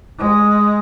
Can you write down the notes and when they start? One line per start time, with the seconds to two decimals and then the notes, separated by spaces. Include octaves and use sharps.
0.18 G#3